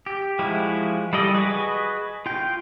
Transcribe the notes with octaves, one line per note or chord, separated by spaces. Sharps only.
G4
F3 G#3 E4 F#4 G4
G3 A4 D5 D#5
F#4 G#4 B4 D#5 C#6
F4 G5